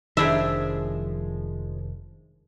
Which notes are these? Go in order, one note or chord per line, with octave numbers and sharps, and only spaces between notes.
F1 D#3 F3 G#3 D4 E4 G4 E5